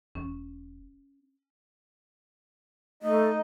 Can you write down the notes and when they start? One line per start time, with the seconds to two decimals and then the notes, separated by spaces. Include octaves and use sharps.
0.15 E1 C#4
3.03 A3 D#4 D#5